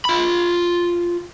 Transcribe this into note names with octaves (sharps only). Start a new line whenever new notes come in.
F4 B5